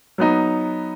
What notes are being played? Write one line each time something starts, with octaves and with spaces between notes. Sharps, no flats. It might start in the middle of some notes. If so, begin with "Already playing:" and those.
F#3 B3 D#4